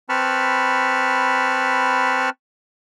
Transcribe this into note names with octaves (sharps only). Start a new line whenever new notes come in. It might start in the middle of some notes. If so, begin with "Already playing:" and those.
C4 B4 A5 B5 C#6 F6